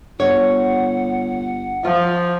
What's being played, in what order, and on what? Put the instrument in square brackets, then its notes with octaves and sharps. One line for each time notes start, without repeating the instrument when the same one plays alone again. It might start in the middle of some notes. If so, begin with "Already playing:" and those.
[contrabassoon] G1 [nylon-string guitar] C#5 [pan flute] F#5
[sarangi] F3 [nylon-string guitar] F4